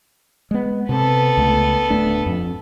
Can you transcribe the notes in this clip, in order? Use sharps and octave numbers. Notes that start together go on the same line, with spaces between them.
G#3 B3
C3 B3 A4
C#2 A3
D1 A3 D4
F2